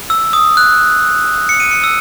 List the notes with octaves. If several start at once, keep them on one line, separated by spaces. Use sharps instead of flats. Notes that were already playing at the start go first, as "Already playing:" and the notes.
E6
D#6
F#6
C#7
D#7
C#7
E6